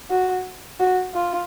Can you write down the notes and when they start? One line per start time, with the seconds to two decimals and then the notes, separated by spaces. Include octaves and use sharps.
0.10 F#4
0.80 F#4
1.14 F4